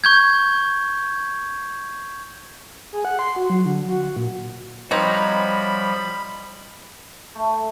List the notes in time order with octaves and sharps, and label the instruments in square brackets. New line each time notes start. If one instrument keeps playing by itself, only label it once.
[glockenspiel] C#6 G6 G#6
[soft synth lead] G#4
F#5
C6
F#4
F#3
D3
F#4
F#4
A#2
[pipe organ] F3 G3 [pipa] C4 D#4 [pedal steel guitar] F#4 C#5 A#5 [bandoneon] B5
[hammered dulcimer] A3